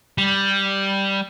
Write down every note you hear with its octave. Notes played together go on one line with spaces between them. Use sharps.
G3